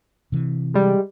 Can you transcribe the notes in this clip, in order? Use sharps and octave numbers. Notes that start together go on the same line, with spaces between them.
C3 E3
G3 G#3